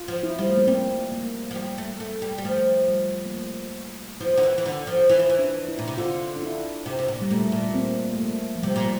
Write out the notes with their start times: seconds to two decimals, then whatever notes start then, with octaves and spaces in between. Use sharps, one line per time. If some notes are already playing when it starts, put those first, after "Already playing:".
Already playing: F4
0.08 F3
0.23 E4
0.39 F3 G3
0.49 A3
0.57 A#3
0.67 G3 C4
1.12 A#3
1.51 F3
1.55 G3
1.78 A3
2.00 A3
2.22 G3
2.38 G3
2.44 F3 A3
2.89 G3
3.26 A#3
3.32 A3
4.21 F3 E4
4.37 D3
4.43 E3
4.58 E3
4.66 D3
4.87 F3
5.09 E3 E4
5.19 F3
5.30 E3
5.39 D4
5.68 E4
5.79 A#2
5.88 C3
5.98 D3 F4
6.36 D4
6.42 E4
6.86 C3
6.99 C3
7.08 A#2
7.21 G3
7.31 A#2 A3
7.52 A#2
7.69 A#3
7.74 C4
8.13 A3
8.19 A#3
8.56 F3
8.63 C3 G3
8.76 A#2